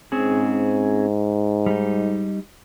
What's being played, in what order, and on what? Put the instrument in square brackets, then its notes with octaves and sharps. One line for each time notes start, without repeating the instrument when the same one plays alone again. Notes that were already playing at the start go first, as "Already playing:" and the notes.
[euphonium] G#2 [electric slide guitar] C4 C#4 G#4
[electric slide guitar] G3 D#4